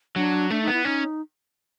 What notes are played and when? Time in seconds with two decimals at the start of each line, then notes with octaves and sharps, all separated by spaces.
0.16 F#3 D4
0.50 A3 D4
0.62 D#4
0.68 B3
0.73 E4
0.85 C#4 D#4